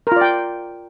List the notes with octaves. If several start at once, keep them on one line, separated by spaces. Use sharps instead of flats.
F4 A#4 D5 G5